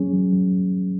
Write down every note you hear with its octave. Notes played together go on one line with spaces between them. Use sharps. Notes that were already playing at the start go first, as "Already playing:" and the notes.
Already playing: F#3 C#4 G#4
F#3
F#3